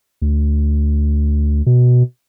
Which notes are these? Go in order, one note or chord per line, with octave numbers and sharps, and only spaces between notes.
D2
B2